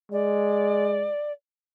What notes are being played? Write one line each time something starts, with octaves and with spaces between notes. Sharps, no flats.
G#3 D5